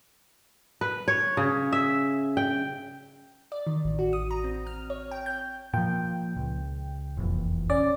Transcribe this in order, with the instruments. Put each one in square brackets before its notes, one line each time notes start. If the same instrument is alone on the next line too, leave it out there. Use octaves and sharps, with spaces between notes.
[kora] B4
C#5
C#3
E5
G5
[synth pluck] D5
D#3
A1
F#4
D#6
A#5
C4
F6
C#5
G5
G6
[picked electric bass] A#2 F3 [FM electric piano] G5
[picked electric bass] C#2
F1 A#1 E2
[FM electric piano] C#4 D5